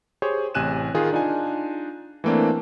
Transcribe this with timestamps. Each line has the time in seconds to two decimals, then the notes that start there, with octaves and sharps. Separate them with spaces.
0.22 G4 G#4 C5 C#5
0.55 A1 C3 G#5 F#6 D#7 E7
0.94 D#3 F4 G#4
1.13 D4 D#4 F4 G#5
2.24 E3 A3 A#3 C4 D4